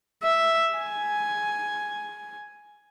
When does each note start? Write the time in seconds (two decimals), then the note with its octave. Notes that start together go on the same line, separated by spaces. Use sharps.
0.23 E5
0.77 G#5